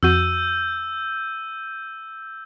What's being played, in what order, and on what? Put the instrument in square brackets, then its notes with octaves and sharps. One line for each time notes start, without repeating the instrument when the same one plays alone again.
[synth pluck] F2 F#4 [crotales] E6 G6 D#7